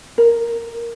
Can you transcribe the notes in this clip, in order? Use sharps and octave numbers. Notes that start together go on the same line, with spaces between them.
A#4